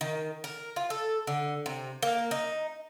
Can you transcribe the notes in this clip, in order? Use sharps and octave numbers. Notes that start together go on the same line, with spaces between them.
D#3
A#4
F4
A4
D3
C3
A#3
D#4